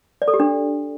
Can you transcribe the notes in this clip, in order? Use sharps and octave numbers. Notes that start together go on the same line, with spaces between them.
D5
A4
G4
D4